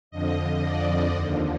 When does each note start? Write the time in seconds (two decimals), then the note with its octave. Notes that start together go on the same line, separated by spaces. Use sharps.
0.11 F2 D3 F3 D#5
0.62 D5
1.12 D#2 D3 F3